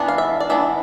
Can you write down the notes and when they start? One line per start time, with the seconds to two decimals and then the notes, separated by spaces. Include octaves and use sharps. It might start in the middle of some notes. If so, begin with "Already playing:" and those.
Already playing: E3 B3 D4
0.08 F5
0.18 E5
0.40 D5
0.50 E3 B3 D4 E5